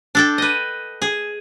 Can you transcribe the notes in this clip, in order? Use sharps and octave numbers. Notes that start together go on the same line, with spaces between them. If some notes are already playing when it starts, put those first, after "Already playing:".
D4 A4 G5
B4 D#5
G#4